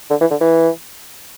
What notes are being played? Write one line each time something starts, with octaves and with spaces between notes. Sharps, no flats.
D3
E3
D3
E3